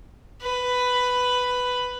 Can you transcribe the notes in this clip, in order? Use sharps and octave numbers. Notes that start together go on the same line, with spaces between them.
B4